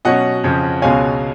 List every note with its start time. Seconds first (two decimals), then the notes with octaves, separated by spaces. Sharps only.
0.05 B2 F#3 C#4 D#5 F#5
0.44 F2 C#3 F3
0.82 C#2 B2 G#3 C#4 F5 G#5